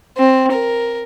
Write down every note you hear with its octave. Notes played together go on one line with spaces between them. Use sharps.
C4
A#4